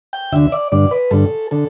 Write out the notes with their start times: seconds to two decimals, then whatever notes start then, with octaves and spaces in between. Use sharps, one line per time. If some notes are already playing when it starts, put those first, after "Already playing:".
0.13 G5
0.32 D2 D3 E5
0.52 D5
0.72 G2 D3 D5
0.91 B4
1.11 G2 D3 A4
1.51 D3 A4